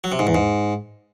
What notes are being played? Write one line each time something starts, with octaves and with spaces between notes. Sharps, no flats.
F#3
C3
G#2
E2
G#2